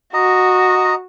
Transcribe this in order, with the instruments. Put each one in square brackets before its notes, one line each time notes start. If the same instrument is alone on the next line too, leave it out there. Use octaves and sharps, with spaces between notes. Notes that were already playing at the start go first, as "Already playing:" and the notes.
[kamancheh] F#4 [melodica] D#5 A#5